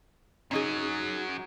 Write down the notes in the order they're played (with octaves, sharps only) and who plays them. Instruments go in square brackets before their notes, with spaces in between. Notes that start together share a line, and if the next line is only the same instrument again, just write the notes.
[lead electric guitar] F#2 F#3 [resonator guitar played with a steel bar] C#4 D#4 G#4